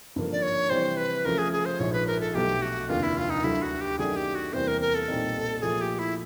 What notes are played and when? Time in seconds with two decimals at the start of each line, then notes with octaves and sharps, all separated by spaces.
0.16 G#1 G2 D3 F3 A#3
0.32 D5
0.42 C#5
0.70 C3 E3 G3 C5
0.97 B4
1.25 C#2 C#3 F3 A3 A#4
1.38 G#4
1.52 G#4
1.65 C5
1.80 A#1 G#2 F3 C#5
1.93 B4
2.07 A#4
2.20 A4
2.34 B1 B2 F#3 A3 G4
2.62 F#4
2.89 F1 D#2 D3 F4
3.03 E4
3.17 F4
3.30 D#4
3.44 D2 D3 F#3 E4
3.62 F#4
3.81 G4
3.98 F#2 D#3 F#3 A3 D4 G#4
4.16 G4
4.35 F#4
4.53 E2 C3 E3 G3 A#3 C5
4.68 A#4
4.81 A#4
4.95 A4
5.08 B1 A#2 G3 C4 D#4
5.62 A#2 F3 A3 G#4
5.81 G4
5.99 E4